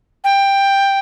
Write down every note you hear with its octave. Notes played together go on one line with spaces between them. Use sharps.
G5